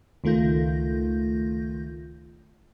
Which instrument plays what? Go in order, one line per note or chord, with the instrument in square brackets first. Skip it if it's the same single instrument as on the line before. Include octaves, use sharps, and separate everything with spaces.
[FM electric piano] C#2 D#3 A3 F4 G6 A#6